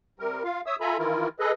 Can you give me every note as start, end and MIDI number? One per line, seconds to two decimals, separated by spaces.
0.20 0.43 48
0.20 0.43 55
0.20 0.43 70
0.44 0.61 65
0.44 0.61 77
0.66 0.76 73
0.66 0.76 76
0.66 0.76 87
0.66 0.76 88
0.81 0.97 65
0.81 0.97 69
0.81 0.97 76
0.81 0.97 80
0.81 0.97 82
0.81 0.97 83
0.98 1.28 51
0.98 1.28 52
0.98 1.28 64
0.98 1.28 65
0.98 1.28 70
1.39 1.52 68
1.39 1.52 69
1.39 1.52 71
1.39 1.52 75